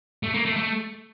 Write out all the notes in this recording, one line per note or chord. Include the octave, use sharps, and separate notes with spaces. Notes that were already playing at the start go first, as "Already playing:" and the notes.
A3
A#3
A3
A3